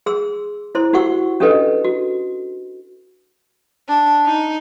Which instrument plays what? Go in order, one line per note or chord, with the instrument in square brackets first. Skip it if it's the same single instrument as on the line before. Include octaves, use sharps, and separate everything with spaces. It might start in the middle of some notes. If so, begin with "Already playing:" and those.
[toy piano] G#4 C6 E6
E4 C5 C6
D#4 F#4 G4 F#5 C#6 E6
C#4 D4 G4 A4 B4 D#5
F#4
[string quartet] D4
D#4